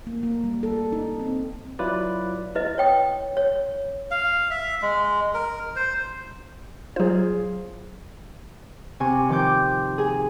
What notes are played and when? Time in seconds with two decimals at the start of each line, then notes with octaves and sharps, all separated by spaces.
0.07 A#3
0.23 A#3
0.44 G3
0.63 A4
0.92 D#4
1.19 C4
1.79 F#3 E4 F4 B4 D5
2.55 E4 B4 D#5
2.78 C#5 G5 D#6
3.37 C#5
4.11 F5
4.51 E5
4.82 G#3
5.34 A#4
5.76 C5
6.96 F#3 F4 G#4 C5
9.00 C3 G#5 C#6
9.29 D#3 F3 C5 G5 D6 G6
9.98 G#4 G#5